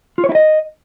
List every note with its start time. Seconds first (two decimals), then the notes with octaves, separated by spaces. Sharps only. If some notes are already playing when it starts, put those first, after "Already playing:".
0.18 F4
0.24 C#5
0.29 E4
0.35 D#5